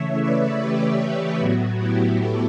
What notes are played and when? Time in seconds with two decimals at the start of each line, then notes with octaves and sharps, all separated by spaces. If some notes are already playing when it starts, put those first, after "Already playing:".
Already playing: C#3 E3 A3 C#5 E5
0.21 B4 D5
0.60 G4 B4
1.39 A2 F#3 B3 F#4
1.78 E4 G4
2.17 F#4 A4